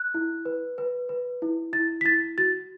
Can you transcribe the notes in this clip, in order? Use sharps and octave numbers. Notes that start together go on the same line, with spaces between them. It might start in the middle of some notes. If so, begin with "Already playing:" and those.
Already playing: F#6
E4
B4
B4
B4
E4
E4 A6
B6
E4 A6
F#4 A6